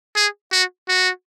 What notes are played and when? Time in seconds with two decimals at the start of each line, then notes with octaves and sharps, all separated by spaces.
0.16 G#4
0.52 F#4
0.88 F#4